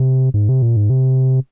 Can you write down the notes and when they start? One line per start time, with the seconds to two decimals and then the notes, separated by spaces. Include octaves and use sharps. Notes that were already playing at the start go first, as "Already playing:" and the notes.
Already playing: C3
0.34 G#2
0.49 C3
0.62 A#2
0.76 G#2
0.90 C3